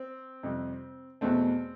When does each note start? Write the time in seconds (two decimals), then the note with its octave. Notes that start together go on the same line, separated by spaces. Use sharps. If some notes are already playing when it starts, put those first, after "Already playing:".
Already playing: C4
0.43 F2 C3 G3
1.21 E2 B2 A3 C4